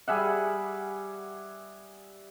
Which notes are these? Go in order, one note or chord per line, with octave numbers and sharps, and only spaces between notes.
G3 G#4 E5 F#5